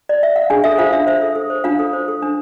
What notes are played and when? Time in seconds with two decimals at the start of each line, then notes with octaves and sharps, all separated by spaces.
0.09 D5
0.23 E5
0.36 F5
0.50 D4 G#4 G#5
0.64 A4 E5
0.78 F4 C5 F5
0.92 D4 E5
1.07 C5 E5
1.22 A4
1.35 A4
1.50 C5
1.64 D4 F4 F5
1.79 A4
1.93 C5
2.08 A4
2.22 D4